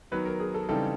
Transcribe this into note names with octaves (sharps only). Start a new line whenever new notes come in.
D#3 F#3 B3 B4
A#4
G#4
A4
C#3 E3 G3 C4 D#4 A4